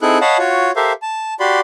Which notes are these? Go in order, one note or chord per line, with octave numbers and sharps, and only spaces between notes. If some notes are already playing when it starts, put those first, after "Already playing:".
C4 D#4 E4 G#4 A4 F#6
C#5 D#5 F5 F#5 A5 B5
F4 F#4 C#5
G4 A4 A#4 C5 E5 F5
A5
F#4 G4 D5 B5 C6